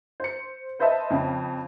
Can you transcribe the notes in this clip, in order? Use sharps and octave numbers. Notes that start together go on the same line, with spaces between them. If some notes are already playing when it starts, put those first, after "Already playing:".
C5 C#7
B4 C5 D#5 E5 A5
F2 C#3